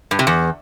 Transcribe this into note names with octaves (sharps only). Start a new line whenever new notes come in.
G2
C3
E2